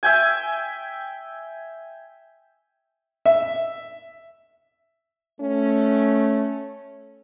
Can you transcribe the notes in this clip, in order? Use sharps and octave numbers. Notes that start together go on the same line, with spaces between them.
E5 G5 G#5
E5
A3 C#4